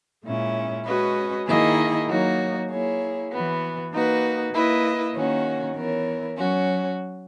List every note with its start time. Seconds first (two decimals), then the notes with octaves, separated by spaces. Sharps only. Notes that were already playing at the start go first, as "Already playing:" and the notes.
0.24 A#2 G#3 C#4 E4
0.86 G#3 C#4 F#4 B4 D#5
1.47 D#3 A#3 E4 G#4 D#5
2.08 F#3 A#3 D#4 F#4 C#5
2.69 A#3 E4 G#4 C#5
3.31 E3 B3 F#4
3.93 A#3 D#4 F#4 B4
4.53 A#3 E4 B4 D#5
5.15 D#3 A#3 C#4 F#4
5.76 E3 B3 E4 A#4 C#5
6.37 F#3 C#4 F#4